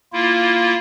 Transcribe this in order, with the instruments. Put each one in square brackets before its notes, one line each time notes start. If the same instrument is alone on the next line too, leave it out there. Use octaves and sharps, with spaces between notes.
[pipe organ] A#3 E4 F4